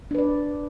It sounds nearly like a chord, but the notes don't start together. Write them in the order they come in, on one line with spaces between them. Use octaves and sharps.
D4 B4 D5